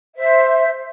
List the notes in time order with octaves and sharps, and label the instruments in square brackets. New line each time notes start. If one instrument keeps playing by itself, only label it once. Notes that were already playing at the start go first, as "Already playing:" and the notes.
[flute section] C5 E5